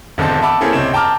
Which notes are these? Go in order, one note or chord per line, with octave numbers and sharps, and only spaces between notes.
E1 D3 D#3 C4 A5
E5 F#5 A5 B5 D6 E6
A#3 C4 C#4 E4 G#4 A4
C#2 C3 C4 C#5 E7
G5 A5 A#5 D6 F6